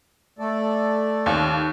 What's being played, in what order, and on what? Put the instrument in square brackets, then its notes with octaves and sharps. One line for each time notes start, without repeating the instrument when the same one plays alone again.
[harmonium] A3 A4 D5
[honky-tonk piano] D#2